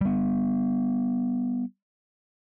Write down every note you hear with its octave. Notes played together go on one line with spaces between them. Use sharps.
G3 B3